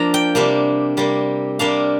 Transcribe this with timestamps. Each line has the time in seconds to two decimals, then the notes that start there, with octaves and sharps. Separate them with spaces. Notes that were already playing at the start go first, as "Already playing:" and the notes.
Already playing: F3 A#3 D4 A#5
0.14 G5
0.35 C3 G3 A#3 D4
0.97 C3 G3 A#3
1.59 C3 G3 A#3 D4 F5